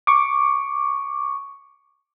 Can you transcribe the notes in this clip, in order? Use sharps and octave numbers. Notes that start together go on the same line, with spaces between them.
C#6 D6